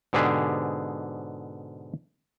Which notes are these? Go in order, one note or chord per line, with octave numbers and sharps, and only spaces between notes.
G#2 B2 D3 G4 G#4 F5